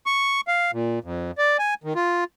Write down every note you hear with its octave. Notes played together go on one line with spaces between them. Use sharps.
C#6
F5
A#2
F2
D5
G#5
D#3
F4